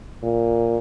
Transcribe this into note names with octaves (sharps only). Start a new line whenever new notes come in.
A#2